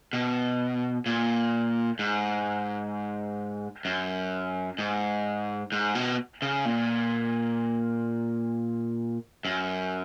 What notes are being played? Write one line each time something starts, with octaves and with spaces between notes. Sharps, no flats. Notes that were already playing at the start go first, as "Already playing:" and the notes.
B2
A#2
G#2
F#2
G#2
G#2
B2
C#3
A#2
F#2